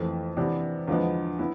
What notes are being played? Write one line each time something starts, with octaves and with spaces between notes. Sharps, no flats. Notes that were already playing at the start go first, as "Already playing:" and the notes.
Already playing: F2 E3 A3 C4
C3 E3 B3 D4
E2 D3 F3 G#3 B3
B3 E4